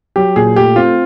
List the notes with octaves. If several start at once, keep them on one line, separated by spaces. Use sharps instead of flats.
F#3 G4
A#2 G#4
A3 G4
C4 F4